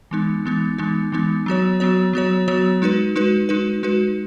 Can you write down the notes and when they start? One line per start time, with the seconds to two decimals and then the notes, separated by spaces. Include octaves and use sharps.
0.11 E3 G#3 B3 D#4
0.45 E3 G#3 B3 D#4
0.78 E3 G#3 B3 D#4
1.12 E3 G#3 B3 D#4
1.46 F#3 B3 F#4 C#5
1.80 F#3 B3 F#4 C#5
2.13 F#3 B3 F#4 C#5
2.48 F#3 B3 F#4 C#5
2.82 G#3 D#4 F#4 B4
3.16 G#3 D#4 F#4 B4
3.49 G#3 D#4 F#4 B4
3.83 G#3 D#4 F#4 B4